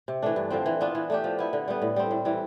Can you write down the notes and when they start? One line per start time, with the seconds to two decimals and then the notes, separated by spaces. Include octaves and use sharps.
0.08 C3
0.23 E3 A3 D4
0.36 G2
0.50 D3 F3 C4
0.66 E3
0.81 B3 D4 F4
0.95 E3
1.10 A3 D4 G4
1.24 F3
1.39 B3 E4
1.53 D3
1.68 G3 B3
1.82 A2
1.96 G3 C4
2.11 A2
2.25 E3 G3